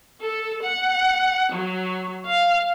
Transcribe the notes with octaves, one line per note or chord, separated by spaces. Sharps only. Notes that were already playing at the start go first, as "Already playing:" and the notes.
A4
F#5
F#3
F5